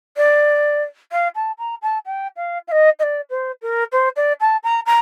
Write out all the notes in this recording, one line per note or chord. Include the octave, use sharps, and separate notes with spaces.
D5
F5
A5
A#5
A5
G5
F5
F5
D#5
D#5
D5
C5
A#4
C5
D5
A5
A#5
A#5